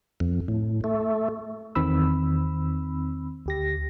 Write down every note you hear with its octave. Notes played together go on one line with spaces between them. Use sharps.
F2
A2
A3
E2 D#3 C4 B5 E6
D2 G4 A#6